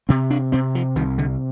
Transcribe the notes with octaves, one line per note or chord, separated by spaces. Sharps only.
C3 C4
D4
C3 C4
F3
C2 D#3
D3